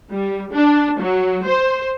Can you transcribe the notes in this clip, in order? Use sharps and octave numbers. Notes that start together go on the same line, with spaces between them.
G3
D4
F#3
C5